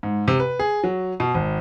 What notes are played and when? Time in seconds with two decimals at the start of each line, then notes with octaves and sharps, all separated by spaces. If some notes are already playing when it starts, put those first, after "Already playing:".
0.03 G#2
0.28 C3
0.40 B4
0.59 G#4
0.84 F#3
1.20 B2
1.34 G#1